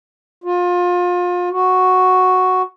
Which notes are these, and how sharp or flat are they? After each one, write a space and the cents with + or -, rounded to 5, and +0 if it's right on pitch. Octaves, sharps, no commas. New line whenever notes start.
F4 +30
F#4 +0